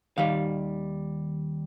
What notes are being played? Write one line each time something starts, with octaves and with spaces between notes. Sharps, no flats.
D#2 D#3 G3 F5